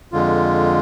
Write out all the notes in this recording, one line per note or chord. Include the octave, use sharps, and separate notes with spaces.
F2 D3 G#3 F4